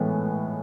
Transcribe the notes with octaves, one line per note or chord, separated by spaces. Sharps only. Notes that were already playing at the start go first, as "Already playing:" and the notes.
Already playing: A2 E3 G#3 B3